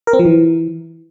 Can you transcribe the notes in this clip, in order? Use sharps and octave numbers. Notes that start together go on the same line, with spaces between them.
A#4
C4
F3
E3